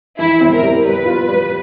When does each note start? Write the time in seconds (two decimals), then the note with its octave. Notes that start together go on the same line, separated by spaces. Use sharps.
0.19 E3 E4
0.41 C4
0.52 A#4
0.63 G3
0.84 G3 B4
1.06 F4
1.28 G3